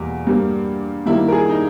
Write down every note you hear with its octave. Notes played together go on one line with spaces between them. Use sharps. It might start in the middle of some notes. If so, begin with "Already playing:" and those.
Already playing: E2 B2 G3 A#3
G2 G3 A#3
G2 D#3 G3 A#3 E4
A#4
G#4
D#4